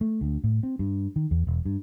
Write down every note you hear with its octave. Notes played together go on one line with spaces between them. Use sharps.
A3
D2
A2
C4
G2
D#3
E2
E1
G2